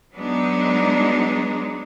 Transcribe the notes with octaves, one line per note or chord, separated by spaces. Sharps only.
F#3 G#3 B3 D4 D#4